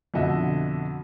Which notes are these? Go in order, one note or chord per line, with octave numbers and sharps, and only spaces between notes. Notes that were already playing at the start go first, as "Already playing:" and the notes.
F2 B2 D3 D#5 E5